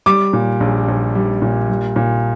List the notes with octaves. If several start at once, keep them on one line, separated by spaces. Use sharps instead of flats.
G3 D6
A#2
A#1
A#1
G3
A#2
G3
A#2